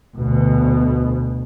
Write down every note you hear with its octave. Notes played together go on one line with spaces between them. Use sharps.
D2 B2